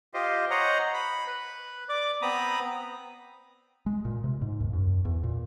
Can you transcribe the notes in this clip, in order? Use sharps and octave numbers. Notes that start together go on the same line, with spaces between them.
F4 G4 C5 D#5
C5 C#5 D#5 F#5 A#5
B5
B4
D5 D6
B3 C4 A#5 B5 D#6
G#3
A#2
C3
G#2
D#2
F#2
E2
A#2